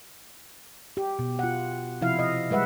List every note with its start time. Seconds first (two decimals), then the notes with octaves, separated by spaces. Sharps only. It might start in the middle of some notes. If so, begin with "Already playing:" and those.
0.97 G4
1.19 B2
1.39 F4 F#5
2.01 C3 F3 E4 F5
2.19 D#5
2.50 G3 G#3 B4 E5 F#5